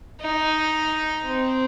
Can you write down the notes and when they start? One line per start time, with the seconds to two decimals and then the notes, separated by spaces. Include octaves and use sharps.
0.21 D#4
1.25 C4